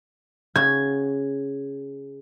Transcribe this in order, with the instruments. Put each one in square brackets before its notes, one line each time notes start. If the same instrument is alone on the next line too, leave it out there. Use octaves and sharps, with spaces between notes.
[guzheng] C#3 F#4 [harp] G#6